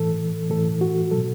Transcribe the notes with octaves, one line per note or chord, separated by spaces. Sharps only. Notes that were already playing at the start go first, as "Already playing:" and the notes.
Already playing: A2 E3 A4
A2 E3 A4
F#4
B2 F#3 A4